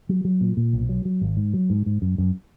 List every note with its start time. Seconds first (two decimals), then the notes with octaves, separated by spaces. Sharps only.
0.09 F#3
0.25 F#3
0.41 A#2
0.57 A#2
0.73 B1
0.89 F#3
1.05 F#3
1.21 G#1
1.37 G#2
1.54 F#3
1.70 G#2
1.86 G#2
2.02 F#2
2.18 F#2